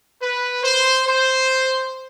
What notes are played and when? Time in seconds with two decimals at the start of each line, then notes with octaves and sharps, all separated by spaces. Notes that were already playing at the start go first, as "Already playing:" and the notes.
0.22 B4
0.64 C5
1.08 C5